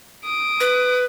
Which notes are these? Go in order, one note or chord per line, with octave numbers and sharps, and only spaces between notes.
D#6 D7
B4